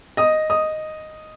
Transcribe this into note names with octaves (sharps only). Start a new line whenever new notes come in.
D#5 D#6
D#5 D#6